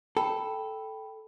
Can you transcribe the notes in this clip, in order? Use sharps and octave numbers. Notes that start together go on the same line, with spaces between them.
A4 G5 B5